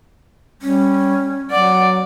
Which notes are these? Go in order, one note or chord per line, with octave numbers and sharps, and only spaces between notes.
G3 C#4
F#3 D5 F#5